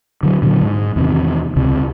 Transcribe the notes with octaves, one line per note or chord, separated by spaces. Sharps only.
D3 F#3
A#2 D3 E3 F#3
G#2
E2 C3 D#3
C#2 C3